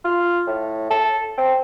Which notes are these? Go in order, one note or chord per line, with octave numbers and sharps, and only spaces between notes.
F4
A2
A4
C4